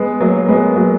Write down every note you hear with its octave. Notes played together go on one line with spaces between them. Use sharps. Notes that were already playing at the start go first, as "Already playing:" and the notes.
Already playing: G#3 B3
F#3 A#3
G#3 B3
F#3 A#3